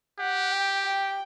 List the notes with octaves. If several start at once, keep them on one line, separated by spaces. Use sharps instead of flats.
G4 F#5
G5
G5